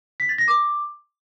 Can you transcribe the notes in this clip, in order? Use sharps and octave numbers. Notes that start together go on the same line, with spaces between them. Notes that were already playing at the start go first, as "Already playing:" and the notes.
B6
A6
A#6
D6